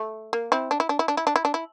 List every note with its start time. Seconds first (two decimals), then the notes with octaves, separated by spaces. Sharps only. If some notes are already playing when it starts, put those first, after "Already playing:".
Already playing: A3
0.33 A#3
0.52 C4 E4
0.71 D4
0.80 E4
0.89 D4
0.99 E4
1.08 D4
1.17 E4
1.27 D4
1.36 E4
1.45 D4
1.54 E4